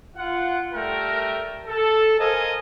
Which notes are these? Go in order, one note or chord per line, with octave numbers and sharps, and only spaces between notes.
F4 F#5
G3 A3 A#4 G5
A4
A4 A#4 C5 D#5 F5 G#5